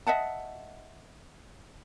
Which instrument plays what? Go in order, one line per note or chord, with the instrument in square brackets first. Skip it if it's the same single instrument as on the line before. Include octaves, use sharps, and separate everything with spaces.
[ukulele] D#5 E5 F#5 A5